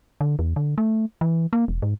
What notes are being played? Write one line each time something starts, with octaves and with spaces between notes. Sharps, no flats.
D3
E2
D3
A3
E3
A#3
E1
G#2